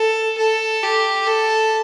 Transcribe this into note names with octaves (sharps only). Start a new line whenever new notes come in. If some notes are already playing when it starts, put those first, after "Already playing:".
Already playing: A4
A4
G4
A4